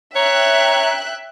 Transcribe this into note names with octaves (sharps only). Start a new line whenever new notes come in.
C#5 E5 G5 A#5 F#6